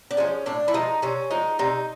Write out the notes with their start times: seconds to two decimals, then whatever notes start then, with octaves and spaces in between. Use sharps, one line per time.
0.11 D4
0.17 F3 G#3 C#4
0.46 A2 D4
0.68 E4
0.74 F3 G#3 D#4
1.02 C3 C#4
1.31 F3 G#3 D#4
1.59 C3 D#4